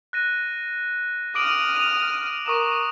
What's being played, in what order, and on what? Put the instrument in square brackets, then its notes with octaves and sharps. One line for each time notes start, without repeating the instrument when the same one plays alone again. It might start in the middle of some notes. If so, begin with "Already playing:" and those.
[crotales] F#6 A#6 D#7
[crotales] D6 D7 F#7 [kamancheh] D#6 F6
[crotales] D#7 F7
[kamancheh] A#4 [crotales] C#6 D#6 E7